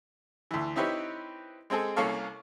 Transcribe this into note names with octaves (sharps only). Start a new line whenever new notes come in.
D2 E3
C4 D#4 E4 G4 B4 C#5
G#3 C4 G#4 A4
C2 A#3 C#4 A4 F5 C#6